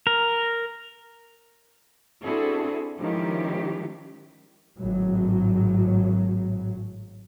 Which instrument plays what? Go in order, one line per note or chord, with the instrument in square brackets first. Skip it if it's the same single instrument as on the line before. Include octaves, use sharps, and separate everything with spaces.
[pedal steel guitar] A#4
[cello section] C4 D4 E4 F#4 G#4 A4
D#3 F3 G#3 C#4 E4 G4
[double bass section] G#1 A2 F#3